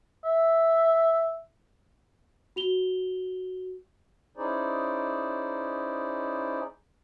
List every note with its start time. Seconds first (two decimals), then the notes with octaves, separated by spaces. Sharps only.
0.24 E5
2.56 F#4 F7 G7
4.37 C#4 D#4 E4 G#4 C5 D5